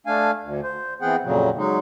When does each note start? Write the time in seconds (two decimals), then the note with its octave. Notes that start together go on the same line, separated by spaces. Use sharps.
0.06 A3 D4 F5 G#5
0.42 D2
0.63 C5
1.01 E3 B3 C4 G#4 F#5 G5
1.23 F2 A#2 C#3 F#3
1.57 F#3 G#3 D#4